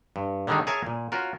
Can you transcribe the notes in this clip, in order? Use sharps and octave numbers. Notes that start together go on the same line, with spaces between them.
G2
D3 D#3 G3 G#3 D4 D#4
G#4 A#4 C#5 E5 G#5 A5
A#2
C#4 F4 F#4 A#4